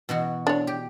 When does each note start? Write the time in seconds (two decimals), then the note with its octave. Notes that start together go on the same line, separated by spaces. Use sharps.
0.09 B2 E3 F#4
0.47 D4 C#5
0.67 G4